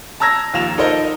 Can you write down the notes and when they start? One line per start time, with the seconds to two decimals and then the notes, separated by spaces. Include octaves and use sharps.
0.20 A5 A#5 E6 G#6 A#6
0.54 D#2 F3 F4 E7 F7
0.78 D#4 A4 A#4 C5 D#5